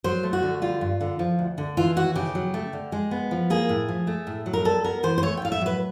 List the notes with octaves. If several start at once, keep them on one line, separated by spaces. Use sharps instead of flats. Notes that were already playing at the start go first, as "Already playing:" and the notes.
F#3 C5
A3
F#4
D3
G3 F4
G2
D3
F3
D2
D3
E3 F4
D#2 F#4
C#3 G4
F#3
A3
D3
G#3
B3
F3
A#3 G#4
A2
F3
A3
A2
F#3
A#4
G3 A4
B3 A#4
E3 C5
C5
A3 C#5
G5
A2 F5
E5
F#3 B4